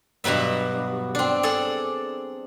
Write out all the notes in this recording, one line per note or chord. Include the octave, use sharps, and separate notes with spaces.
G2 B2 F#3 B3 E5
C4 D4
G#4 A4 D5